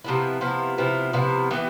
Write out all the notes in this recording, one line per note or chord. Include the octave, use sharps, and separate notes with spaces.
C3 F3 B3 E4
C3 F3 B3 E4
C3 F3 B3 E4
C3 F3 B3 E4
E3 B3 E4 G4